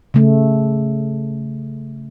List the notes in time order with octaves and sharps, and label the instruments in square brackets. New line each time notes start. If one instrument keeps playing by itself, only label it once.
[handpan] C#3 A3